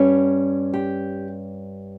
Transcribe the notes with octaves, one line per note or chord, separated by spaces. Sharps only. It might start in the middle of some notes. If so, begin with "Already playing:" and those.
Already playing: G2 G3 C#4
G4